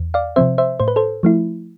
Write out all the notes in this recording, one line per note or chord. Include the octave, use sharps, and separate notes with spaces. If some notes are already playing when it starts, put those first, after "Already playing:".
Already playing: E2
D5 F5
C3 F3 C4 C5 E5
C5 E5
A2 C5
B4
A4 C5
F3 A3 E4